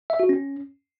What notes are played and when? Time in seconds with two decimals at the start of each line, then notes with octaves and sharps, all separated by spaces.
0.10 E5
0.20 F#4
0.29 C#4